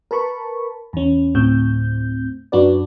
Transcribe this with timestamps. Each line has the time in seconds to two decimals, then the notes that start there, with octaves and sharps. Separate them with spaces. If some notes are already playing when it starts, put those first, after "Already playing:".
0.11 A#4 B4 A5 B5 C#6
0.93 E2 C#4
1.34 D2 A2 C4 G6
2.52 F#2 D4 F#4 B4 D5